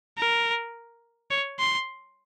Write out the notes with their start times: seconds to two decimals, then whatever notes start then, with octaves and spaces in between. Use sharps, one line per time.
0.18 A#4
1.31 C#5
1.59 C6